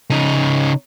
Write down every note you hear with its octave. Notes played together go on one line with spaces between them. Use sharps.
C#3 D#4